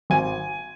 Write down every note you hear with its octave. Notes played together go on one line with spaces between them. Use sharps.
G#1 G#5